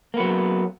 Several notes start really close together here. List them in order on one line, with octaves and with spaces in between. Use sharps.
A#3 B3 F#3